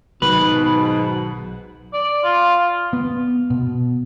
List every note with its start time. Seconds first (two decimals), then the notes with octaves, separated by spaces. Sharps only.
0.22 B1 G#2 B2 D#3 F#3 B4
1.93 D5
2.24 F4
2.93 B3
3.50 B2